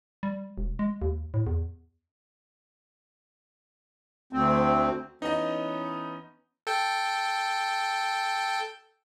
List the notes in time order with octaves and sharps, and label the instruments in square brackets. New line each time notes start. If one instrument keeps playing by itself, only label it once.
[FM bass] G3
E1
G#3
D#2
A2
E2
[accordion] D2 C4
[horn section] E3 B3 C#4 [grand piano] D#4 D#5
[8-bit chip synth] A4 G5